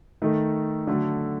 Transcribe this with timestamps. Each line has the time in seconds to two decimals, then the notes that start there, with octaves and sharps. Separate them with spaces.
0.22 D#3 A3 D#4 A4
0.87 D3 F#3 A3